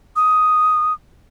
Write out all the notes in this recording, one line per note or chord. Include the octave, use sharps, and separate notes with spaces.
D#6